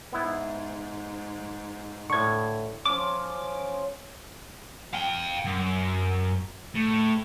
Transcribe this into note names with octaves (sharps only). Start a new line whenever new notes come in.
G#2 B3 E4
A2 D3 C#6 G#6
F3 C#4 D6
F5 G5
F#2
A2